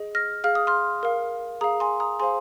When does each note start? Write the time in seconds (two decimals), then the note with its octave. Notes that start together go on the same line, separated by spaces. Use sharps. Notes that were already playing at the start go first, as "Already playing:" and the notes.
Already playing: G#4 D#5
0.15 F6 A#6
0.44 G#4 F5 F6
0.55 D#6
0.67 C6 F6
1.03 A#4 F5
1.61 G#4 F5 A#5 D#6
1.80 G#5 C6
2.00 A#5 D#6
2.20 G#4 C5 F5 G#5 C6